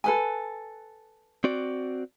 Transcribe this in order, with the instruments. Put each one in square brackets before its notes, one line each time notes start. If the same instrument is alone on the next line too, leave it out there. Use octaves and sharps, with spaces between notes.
[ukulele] A4 B4 G#5
[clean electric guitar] C4 F#4 D5